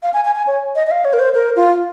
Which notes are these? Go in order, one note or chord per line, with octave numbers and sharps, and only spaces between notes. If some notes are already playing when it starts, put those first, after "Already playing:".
F5
G#5
G#5
G#5
C#5
D#5
D#5
F5
C#5
A#4
C5
A#4
F4